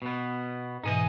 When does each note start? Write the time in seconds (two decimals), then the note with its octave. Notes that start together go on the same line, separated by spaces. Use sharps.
0.02 B2 B3
0.84 G#2 B2 E3 D#4 G#4 D#5